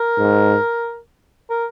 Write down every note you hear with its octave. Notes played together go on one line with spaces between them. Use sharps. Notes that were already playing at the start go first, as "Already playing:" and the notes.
Already playing: A#4
G#2
A#4